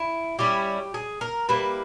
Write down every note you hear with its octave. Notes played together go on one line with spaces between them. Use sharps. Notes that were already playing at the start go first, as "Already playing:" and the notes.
Already playing: E4
G3 C#4 E4 G4
G#4
A#4
G3 A#3 E4 B4